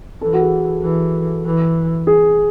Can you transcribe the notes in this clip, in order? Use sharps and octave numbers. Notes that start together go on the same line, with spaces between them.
E3 A4
F#4
G#4
E3
E3
G#4